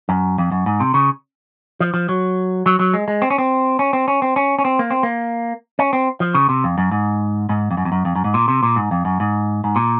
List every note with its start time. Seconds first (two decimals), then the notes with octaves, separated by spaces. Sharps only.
0.09 F#2
0.38 F2
0.52 F#2
0.66 G#2
0.80 C3
0.94 C#3
1.80 F3
1.94 F3
2.09 F#3
2.66 F#3
2.79 F#3
2.94 G#3
3.08 G#3
3.22 C4
3.30 C#4
3.38 C4
3.79 C#4
3.93 C4
4.08 C#4
4.22 C4
4.36 C#4
4.59 C#4
4.65 C4
4.79 A#3
4.91 C4
5.03 A#3
5.79 C#4
5.93 C4
6.20 F3
6.34 C#3
6.49 C3
6.64 F2
6.78 F#2
6.92 G#2
7.49 G#2
7.71 F2
7.77 F#2
7.85 F2
7.92 F#2
8.05 F2
8.16 F#2
8.24 G#2
8.34 A#2
8.48 C3
8.63 A#2
8.76 G#2
8.91 F2
9.05 F#2
9.20 G#2
9.64 G#2
9.76 A#2